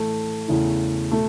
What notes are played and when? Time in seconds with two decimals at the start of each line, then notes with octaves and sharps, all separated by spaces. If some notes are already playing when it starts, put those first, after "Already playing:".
Already playing: A2 E3 A3
0.48 E2 C#3 E3
1.11 B2 A3